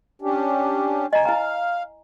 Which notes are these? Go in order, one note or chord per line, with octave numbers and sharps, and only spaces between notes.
C#4 D4 G4
D2 D#5 G#5 A#5
E4 F5 G#5 A#5